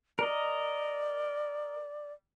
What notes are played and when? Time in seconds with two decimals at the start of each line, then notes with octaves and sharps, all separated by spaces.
0.19 A#4 D5 D#5